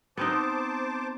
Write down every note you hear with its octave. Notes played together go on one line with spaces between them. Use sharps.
B3 C4 D#4 C5 A5 D6